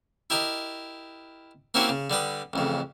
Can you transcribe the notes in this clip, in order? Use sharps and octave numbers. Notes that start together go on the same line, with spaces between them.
E4 G4 A#4 D#5
A#3 C4 C#4 E4 F#4 G4
C#3
D3 G3 B4 D#6
A1 F2 C#3